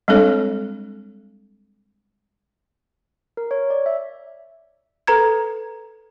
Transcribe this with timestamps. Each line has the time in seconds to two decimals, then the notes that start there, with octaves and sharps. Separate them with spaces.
0.08 G3 G#3 C4 D4 A4 C#5
3.37 A#4
3.51 C#5
3.70 D5
3.86 E5
5.07 A4 B4 A#5 G#6